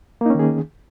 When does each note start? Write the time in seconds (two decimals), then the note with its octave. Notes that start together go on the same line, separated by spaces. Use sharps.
0.21 A#3
0.26 D#4
0.30 C#4
0.35 D#3
0.39 G#4